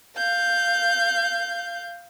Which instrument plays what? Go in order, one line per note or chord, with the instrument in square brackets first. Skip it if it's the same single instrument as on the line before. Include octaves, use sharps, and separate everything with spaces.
[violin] F5 G6